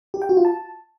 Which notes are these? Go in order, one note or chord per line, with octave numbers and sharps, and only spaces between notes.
G4
G5
F#4
F4
A5